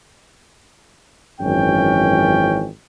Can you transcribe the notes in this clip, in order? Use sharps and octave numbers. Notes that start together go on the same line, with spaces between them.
G#1 F#2 E3 C#4 G5